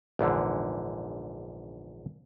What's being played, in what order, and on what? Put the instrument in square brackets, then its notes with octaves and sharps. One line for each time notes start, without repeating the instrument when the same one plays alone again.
[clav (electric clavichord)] A#1 E2 G#2 D3